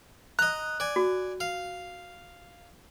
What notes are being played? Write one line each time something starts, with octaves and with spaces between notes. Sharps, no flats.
D#5 A#5 F#6
D5 G#5
F#4
F5